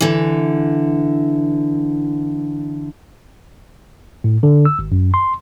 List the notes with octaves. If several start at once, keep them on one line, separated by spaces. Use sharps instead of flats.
D3 E3
A2
D3
E6
G#1
F#2
C6